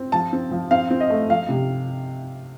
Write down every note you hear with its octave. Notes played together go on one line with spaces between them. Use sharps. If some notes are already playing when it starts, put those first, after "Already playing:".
Already playing: C4
F3 A5
C4
F3
C4 F5
C4
D#5
A3
F3 F5
C3